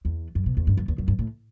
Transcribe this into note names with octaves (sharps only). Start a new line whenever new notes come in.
E2
F#2
B2
E2
G2
F#2
E2
F#2
G2
A2